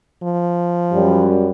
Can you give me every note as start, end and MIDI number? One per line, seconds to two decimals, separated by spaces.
0.23 1.29 53
0.93 1.50 42
0.93 1.50 55